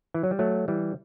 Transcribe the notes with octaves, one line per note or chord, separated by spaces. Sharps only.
E3
F#3
G3
F#3 A3
E3 G3